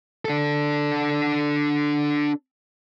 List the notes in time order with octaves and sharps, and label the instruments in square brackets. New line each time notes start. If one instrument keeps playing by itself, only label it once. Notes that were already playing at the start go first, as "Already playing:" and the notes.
[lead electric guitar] D4 A4